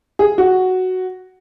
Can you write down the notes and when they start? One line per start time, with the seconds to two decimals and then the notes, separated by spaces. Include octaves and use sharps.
0.19 G#4
0.38 F#4